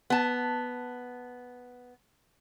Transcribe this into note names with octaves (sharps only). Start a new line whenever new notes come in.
B3 A5